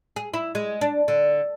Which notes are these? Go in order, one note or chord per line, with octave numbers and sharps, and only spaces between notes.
G#4
E4
G#3
D4
D3